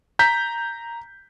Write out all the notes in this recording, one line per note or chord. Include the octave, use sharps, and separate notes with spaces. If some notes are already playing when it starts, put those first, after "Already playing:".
A#5 G6 B6